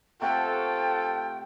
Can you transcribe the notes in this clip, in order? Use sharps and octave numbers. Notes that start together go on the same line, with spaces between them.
C3 A3 F4 A4 F#5 G5